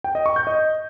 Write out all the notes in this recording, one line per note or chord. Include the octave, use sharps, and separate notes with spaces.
G5
D#5
C#6
G6
D#5